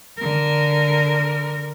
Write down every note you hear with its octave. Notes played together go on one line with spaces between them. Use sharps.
D3 A#4